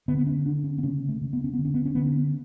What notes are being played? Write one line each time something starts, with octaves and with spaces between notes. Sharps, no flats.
D3 B3
B3
C#4
D3 D4
C#4
B3
C#3 C#4
A3
C#3
B3
C#4
D3 B3
C#4
B3
C#4
D3 B3
C#4
B3